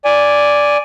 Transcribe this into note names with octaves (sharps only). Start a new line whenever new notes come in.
D5 G#5